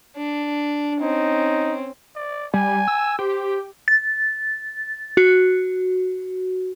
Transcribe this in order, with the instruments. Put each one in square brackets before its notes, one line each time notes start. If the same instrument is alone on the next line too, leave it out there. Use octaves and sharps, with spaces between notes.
[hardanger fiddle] D4
[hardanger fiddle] C4 C#4 [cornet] D#4
[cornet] D5
[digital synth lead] G3 [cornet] G#5
[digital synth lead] E6
[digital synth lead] G4 [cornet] C5
[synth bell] A6
F#4